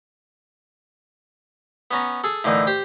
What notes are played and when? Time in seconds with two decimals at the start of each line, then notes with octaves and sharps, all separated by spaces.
1.91 B3 C#4 A#5
2.24 G#4 A4
2.44 A2 D3 E3 A#3 D#4
2.67 G4 C5 G5